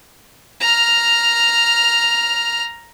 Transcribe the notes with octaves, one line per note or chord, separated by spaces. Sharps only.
A#5 F6